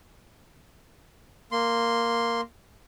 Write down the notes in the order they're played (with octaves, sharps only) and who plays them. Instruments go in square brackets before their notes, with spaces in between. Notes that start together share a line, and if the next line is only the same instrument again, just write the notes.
[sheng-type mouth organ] A#3 C6